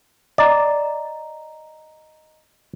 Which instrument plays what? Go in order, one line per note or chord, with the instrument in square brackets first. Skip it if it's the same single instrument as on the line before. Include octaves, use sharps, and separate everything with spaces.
[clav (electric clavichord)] D5 [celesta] D#5 A#5